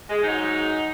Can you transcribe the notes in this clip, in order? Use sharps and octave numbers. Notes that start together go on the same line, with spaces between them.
G#3
G#2 F#3 D#4